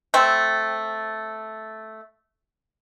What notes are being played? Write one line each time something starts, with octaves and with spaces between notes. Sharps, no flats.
A3 C4